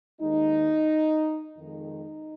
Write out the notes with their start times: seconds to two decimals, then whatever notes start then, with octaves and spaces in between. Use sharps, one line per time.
0.20 D#2 D#3 G#3 D#4
1.58 F2 D#3 G#3 D#4